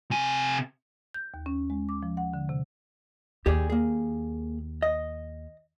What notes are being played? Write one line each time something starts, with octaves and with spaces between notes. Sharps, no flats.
C3 G#5
G6
D#2
C#4
G#3
D6
F3
F#5
D3
C3
D#2 G4 G#4 D5
A#3 G#4
D#5